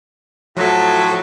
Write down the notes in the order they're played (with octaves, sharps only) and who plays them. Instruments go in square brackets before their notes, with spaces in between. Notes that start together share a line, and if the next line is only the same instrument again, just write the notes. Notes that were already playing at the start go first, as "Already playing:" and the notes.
[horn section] A2 F#3 [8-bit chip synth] F3 A4